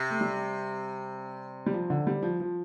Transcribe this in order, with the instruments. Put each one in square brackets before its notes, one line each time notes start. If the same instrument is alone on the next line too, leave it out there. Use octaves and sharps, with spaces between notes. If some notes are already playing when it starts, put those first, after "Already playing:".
Already playing: [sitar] C3
[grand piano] A3
G3
G3
F3
D3
G3
F3
F3